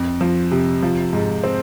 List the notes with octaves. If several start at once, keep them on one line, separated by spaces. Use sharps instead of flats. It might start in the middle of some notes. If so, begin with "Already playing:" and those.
Already playing: F2
F3
C3
F3
G#2
C4